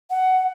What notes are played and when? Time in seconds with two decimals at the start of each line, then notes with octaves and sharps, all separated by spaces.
0.10 F#5